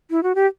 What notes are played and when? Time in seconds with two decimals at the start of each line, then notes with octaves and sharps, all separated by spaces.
0.11 E4
0.23 F#4
0.35 G4